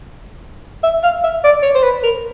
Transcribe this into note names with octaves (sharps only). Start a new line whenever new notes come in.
E5
F5
E5
D5
C#5
C5
B4
A#4